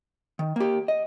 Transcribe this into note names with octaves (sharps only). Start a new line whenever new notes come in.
D#3
A#3 G4
D#5